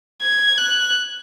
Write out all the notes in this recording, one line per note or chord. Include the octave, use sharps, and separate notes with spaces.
G#6
F#6